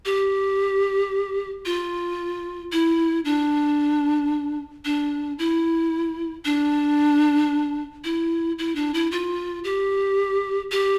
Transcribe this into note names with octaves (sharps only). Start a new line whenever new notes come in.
G4
F4
E4
D4
D4
E4
D4
E4
E4
D4
E4
F4
G4
G4